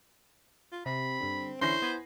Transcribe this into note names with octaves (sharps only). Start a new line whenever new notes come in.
F4
C3 C4 B5
G2 D3
D3 E3 C#4 E4 C5 C6 A#6 C7
B3 G#5 B5